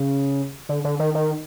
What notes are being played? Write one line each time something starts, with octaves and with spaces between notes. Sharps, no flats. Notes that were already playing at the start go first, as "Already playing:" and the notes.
Already playing: C#3
D3
D3
D#3
D#3